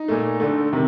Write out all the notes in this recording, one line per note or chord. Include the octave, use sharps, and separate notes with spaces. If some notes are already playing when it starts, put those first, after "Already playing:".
Already playing: D#4
A#2 A3
D3 A3
C3 D#3